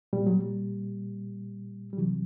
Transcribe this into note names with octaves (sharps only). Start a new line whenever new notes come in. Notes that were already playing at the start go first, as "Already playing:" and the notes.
A#2 G3
F#3
G3
G3
C3 E3 F#3